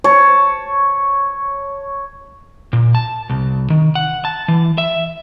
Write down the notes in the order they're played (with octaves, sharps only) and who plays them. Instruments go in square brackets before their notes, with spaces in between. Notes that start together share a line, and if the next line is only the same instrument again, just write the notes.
[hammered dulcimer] C#5 A5
[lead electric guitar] A#2
A5
C2
D#3
F#5
A5
E3
E5